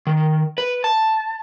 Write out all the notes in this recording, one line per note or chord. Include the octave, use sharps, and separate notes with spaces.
D#3
B4
A5